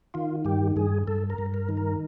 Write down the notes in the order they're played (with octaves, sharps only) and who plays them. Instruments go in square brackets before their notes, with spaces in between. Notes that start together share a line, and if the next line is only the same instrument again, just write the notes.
[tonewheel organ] D#3 F4
G2 G4
G2 G#4
G2 A4
A#4
G2
A#4
D#3
A#4